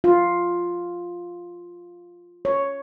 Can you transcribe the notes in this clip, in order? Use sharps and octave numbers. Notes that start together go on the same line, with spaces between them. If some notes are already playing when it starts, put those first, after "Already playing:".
F4
C#5